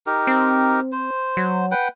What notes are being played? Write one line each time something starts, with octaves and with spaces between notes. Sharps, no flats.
D#4 G4 A#4
C4
C5
F#3
B4 F#5 G5